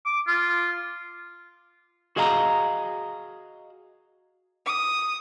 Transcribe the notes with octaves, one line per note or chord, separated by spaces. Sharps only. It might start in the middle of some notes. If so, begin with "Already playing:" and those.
D6
F4
F#4 G#4 D#5 F5 A5 A#5
D#6